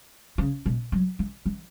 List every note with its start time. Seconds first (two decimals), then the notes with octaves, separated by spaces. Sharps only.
0.38 C#3
0.66 B2
0.92 F#3
1.19 E3
1.46 E3